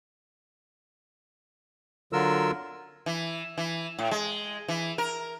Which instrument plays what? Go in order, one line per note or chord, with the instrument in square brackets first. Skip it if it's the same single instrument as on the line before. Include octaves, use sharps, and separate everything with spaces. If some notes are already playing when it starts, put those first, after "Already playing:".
[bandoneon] D3 F#3 F4 A#4 E6
[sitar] E3
E3
A2
G#3
E3
A#4